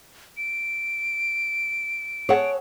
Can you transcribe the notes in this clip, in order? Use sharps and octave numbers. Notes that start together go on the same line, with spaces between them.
D7
G#4 A4 C#5 F#5